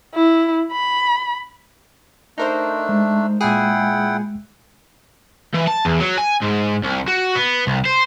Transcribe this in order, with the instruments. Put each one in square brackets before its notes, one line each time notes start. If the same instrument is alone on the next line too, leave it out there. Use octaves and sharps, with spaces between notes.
[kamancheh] E4
B5
[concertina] A3 D4 [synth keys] D#4 A#4 C5
[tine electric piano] G#3
[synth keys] A#2 G#4 [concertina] E4 F#5 G5
[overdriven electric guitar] E3
A5
E2
F#3
G#5
G#2
C2
F#4
B3
C2
C5